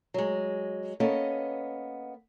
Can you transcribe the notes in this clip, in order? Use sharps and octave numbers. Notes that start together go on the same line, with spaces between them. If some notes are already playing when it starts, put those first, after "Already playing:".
F#3 G#3
A#3 B3 C#4 A4 D#5